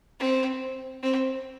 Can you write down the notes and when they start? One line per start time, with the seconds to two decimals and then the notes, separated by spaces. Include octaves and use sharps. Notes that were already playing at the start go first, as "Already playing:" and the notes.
0.20 C4
1.03 C4